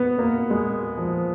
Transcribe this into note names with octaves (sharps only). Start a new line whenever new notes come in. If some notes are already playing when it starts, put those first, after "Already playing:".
Already playing: B3
A#3
G#3
F3